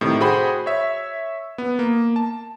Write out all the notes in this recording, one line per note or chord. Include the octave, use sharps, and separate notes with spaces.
A2 C3 D#3
F#4 G#4 C5 G5 B5
C#5 E5
B3
A#3
A5